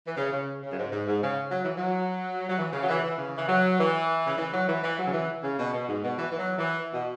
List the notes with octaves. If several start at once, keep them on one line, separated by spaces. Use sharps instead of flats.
E3
C#3
C#3
C#3
F#2
G#2
G#2
G#2
C#3
F#3
E3
F#3
F#3
E3
C#3
F#3
E3
E3
C#3
E3
F#3
E3
C#3
E3
F#3
E3
E3
F#3
C#3
E3
C#3
B2
B2
G#2
B2
E3
E3
F#3
E3
B2